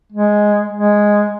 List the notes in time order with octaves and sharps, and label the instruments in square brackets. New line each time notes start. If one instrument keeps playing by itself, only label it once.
[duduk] G#3
G#3